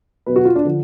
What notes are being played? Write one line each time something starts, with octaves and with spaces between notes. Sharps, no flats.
B2 F#3 B4
F#4
F4
D4
D3 F3